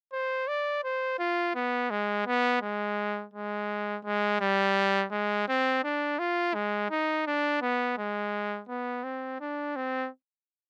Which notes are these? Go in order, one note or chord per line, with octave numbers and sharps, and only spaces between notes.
C5
D5
C5
F4
B3
G#3
B3
G#3
G#3
G#3
G3
G#3
C4
D4
F4
G#3
D#4
D4
B3
G#3
B3
C4
D4
C4